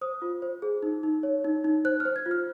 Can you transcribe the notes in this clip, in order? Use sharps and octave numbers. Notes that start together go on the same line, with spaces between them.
C5 D#6
F4
C5
G#4
D#4
D#4
C#5
D#4
D#4
C5 F#6
F6
C5
G#6
F4
F6